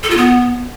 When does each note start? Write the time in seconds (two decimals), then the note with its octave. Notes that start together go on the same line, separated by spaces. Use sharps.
0.03 A4
0.10 F4
0.17 B3